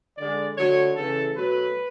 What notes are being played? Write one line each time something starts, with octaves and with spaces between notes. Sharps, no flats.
D3 G#3 D5
D3 F#3 A3 C#5
C#3 E3 A3 A4
B2 F#3 A3 B4